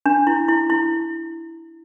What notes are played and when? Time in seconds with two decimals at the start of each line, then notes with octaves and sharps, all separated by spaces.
0.06 D4
0.27 E4
0.48 E4
0.70 E4